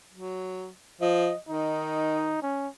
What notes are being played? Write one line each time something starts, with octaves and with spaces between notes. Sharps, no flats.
F#3
F3 D#5
D#3 D#4
C#4